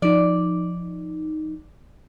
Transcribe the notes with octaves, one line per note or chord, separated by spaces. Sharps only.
F3 D#4 D5